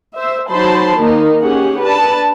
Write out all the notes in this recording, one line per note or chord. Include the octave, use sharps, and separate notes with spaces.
C5 E5
F#3 D#4 C5 A5 B5 C6
D#3 A#3 D#4
C#4 G4 G#4 F#5
D4 B4 A5